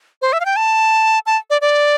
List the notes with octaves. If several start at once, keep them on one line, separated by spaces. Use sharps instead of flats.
C5
E5
F5
G5
A5
A5
D5
D5